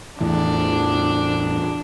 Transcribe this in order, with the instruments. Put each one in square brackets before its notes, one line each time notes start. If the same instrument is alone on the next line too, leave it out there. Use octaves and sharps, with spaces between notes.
[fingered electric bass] E2 A2 E3 [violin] D4